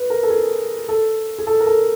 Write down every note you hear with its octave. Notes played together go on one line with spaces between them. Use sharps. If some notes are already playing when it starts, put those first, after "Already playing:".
Already playing: B4
A#4
A4
G#4
A4
G#4
A4
A#4
A4